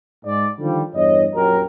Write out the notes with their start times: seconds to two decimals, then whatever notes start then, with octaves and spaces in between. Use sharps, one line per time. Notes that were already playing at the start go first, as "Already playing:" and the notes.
0.25 G#2 D5
0.58 D3 D#3 F3 G3
0.95 E2 G2 C#5 D#5
1.34 A#1 F#2 F#3 G4 A#4